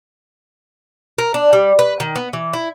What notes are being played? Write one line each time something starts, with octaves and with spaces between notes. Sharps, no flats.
A#4
D4
G3
B4
D#3
B3
E3
E4